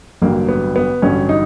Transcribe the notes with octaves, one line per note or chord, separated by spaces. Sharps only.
A1 G2 D3 F#3 A#3
B3
B3
A1 G2 D3 F#3 C#4
D#4